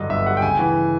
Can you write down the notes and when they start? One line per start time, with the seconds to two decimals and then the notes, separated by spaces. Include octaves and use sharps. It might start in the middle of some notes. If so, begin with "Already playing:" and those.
Already playing: G2 D3 F#3 D#5
0.09 G1 E5
0.26 G3 F#5
0.37 G5
0.42 C#3 G#5
0.59 E3